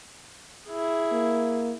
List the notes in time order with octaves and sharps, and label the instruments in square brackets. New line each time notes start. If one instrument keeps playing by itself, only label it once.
[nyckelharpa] E4 G#4
[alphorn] A#3